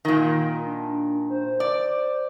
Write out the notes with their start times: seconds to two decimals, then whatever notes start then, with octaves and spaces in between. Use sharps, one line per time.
0.05 A#2 D#3
0.66 D4
1.30 C5
1.60 D5